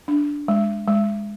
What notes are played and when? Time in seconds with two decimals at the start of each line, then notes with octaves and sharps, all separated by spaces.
0.08 D4
0.48 G#3
0.88 G#3